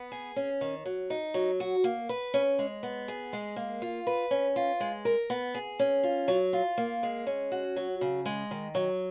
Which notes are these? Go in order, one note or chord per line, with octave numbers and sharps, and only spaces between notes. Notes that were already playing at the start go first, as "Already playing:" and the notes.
Already playing: B3
G#4
C#4
D#3
F#3
D#4
F#3
F#4
A#3
B4
C#4
G#3
B3
G#4
G#3
A#3
F4
B4
C#4
F4
G#3
A#4
B3
G#4
C#4
F4
F#3
F4
A#3
G#3
C#4
F#4
F#3
C#3
G#3
D#3
F#3